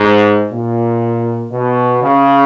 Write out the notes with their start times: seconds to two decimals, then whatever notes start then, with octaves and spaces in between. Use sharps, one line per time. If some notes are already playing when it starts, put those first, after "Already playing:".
Already playing: G#2
0.52 A#2
1.52 B2
2.02 C#3